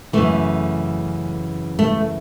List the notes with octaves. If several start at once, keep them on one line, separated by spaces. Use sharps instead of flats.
F#2 C#3 E3 A3
A3